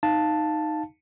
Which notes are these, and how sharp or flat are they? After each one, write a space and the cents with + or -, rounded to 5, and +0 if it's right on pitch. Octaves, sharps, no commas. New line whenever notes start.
D#4 +0 F5 +0 A5 +0